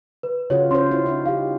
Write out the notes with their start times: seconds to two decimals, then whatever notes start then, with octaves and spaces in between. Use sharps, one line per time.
0.23 B4
0.50 C#3 F4 F#4 C#5
0.71 C#4 E4 C5 C6
0.91 E4 F#4
1.06 D#4 E4 F#4
1.26 D#4 G4 F5